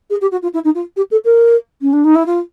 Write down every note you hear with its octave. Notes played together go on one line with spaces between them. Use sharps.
G#4
G4
F#4
F4
E4
D#4
F4
G4
A4
A#4
C#4
D4
D#4
E4
F4